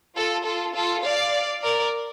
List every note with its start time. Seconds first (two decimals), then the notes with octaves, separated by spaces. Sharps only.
0.16 F4 A4
0.45 F4 A4
0.75 F4 A4
1.04 D5 F5
1.63 A#4 D5